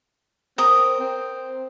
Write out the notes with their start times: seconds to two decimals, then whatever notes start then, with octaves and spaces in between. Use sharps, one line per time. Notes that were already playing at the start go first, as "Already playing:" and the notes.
0.58 C4 A#4 D#6
1.00 C4